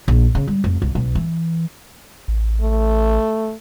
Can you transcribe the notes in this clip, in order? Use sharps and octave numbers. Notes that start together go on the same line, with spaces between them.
A#1
C#3
G3
F1
C2
B1
E3
A1
A3